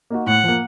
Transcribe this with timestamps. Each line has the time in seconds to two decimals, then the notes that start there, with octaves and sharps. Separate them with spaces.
0.10 A#3 D#4 F#4
0.26 A2 F#5
0.44 F3 A#3